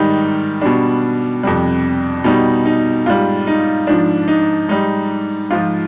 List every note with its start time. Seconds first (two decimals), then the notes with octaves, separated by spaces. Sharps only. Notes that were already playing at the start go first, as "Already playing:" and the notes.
Already playing: G#2 D#3 G3 D#4
0.61 B2 G3 D4
1.43 F2 C3 G3
2.24 B2 G3 D#4
2.65 D#4
3.06 G#2 G3 F4
3.47 D#4
3.87 G#2 F3 D4
4.28 D#4
4.69 G#2 G3 D#4
5.50 G#2 F3 F4